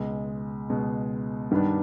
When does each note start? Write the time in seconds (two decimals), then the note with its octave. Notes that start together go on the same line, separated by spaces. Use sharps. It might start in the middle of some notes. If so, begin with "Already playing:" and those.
Already playing: C#2 B2 G#3
0.70 C#2 B2 G#3
1.51 G2 D#3 G3 B3 D4